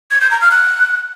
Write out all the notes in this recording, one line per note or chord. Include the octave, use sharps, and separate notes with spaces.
G#6
G6
A#5
F6
F#6